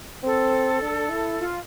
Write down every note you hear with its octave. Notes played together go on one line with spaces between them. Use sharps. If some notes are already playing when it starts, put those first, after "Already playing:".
C4 A4
D4
E4
F4